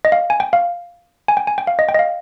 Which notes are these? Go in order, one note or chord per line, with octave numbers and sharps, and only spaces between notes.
D#5
F5
G#5
G5
F5
G#5
G5
G#5
G5
F5
D#5
G5
D#5
F5